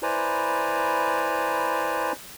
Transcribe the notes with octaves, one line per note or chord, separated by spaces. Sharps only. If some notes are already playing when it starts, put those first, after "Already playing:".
E4 B4 C5 D5 G#5 A#5